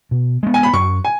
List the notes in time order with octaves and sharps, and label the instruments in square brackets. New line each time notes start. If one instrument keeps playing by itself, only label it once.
[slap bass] B2
G#3 B3
[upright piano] G#5
B5
[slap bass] F#2 [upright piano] C#6
[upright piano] G#5